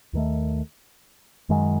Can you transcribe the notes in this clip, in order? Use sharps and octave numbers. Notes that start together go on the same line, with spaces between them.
D#2 D#3 A3
F#2 D#3 G#3